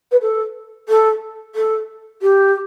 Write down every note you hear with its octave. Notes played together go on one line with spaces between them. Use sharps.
B4
A4
A4
A4
G4